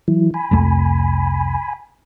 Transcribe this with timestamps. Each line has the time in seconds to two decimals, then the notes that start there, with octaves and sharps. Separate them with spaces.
0.08 E3 F#3 E4
0.34 G#5 B5
0.51 C2 F2 A3